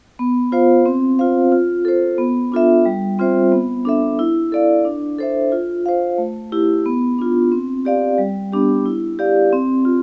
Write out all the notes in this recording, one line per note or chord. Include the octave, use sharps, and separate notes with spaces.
B3
F4 C5 F5
C4
F4 C5 F5
F4
A4 C5
B3
D4 F4 A4 E5
G3
C4 F4 C5 E5
B3
D4 A4 E5
E4
A4 D5 F5
D4
A4 C5 E5
F4
C5 F5
A3
E4 G4
B3
D4 F4
C4
G4 D5 F5
G3
B3 D4 G4
E4
G4 D5 F5
C4
F4